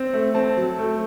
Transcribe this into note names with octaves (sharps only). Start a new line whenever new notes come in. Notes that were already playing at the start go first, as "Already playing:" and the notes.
Already playing: C4
A3
C4 A5
F#3
A3